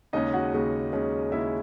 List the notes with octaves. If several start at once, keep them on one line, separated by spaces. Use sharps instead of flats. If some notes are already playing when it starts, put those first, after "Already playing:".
D#2 C#3 G#3 C#4 D#4 D#5
F#4 F#5
D#2 C#3 G#3 C#4
D#2 C#3 G#3 C#4
D#2 C#3 G#3 C#4 E4 E5